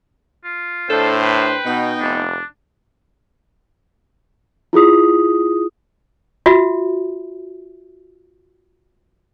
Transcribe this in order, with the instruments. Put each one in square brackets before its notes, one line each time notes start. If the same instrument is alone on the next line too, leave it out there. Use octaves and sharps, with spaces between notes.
[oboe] F4
[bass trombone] A2 [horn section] D4 C5 [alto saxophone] A4
[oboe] B4 [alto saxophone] G5
[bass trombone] B2 [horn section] B3 D#4
[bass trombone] F1 [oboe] D4
[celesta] E4 F4 G#4 D#6
[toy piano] F4 F#4 E5